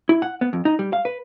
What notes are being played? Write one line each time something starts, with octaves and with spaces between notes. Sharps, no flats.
E4
F#5
B3
F2
D#4
G3
F5
B4